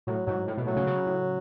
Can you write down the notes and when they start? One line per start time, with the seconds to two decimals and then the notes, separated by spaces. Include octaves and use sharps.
0.07 A2 F#3
0.27 G#2 F#3
0.47 A2
0.57 B2
0.67 A2 F#3
0.76 C#3
0.87 C#3
1.06 A2